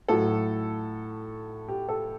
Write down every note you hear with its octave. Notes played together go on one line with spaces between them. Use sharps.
A2 F#3 A4
G4
A4